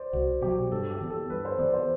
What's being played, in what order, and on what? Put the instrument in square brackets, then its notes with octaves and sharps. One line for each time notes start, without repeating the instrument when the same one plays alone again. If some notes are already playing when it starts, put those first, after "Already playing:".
Already playing: [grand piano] C5 D5
[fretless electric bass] C2 [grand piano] F#4
[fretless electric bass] B2 F#3 [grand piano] G4
[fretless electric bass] G2 [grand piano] A4
[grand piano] G4
[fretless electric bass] E3 B3
[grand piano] A4
[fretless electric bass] G2 [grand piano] B4
[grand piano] C5
[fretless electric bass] E3 B3 [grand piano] D5
[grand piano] C5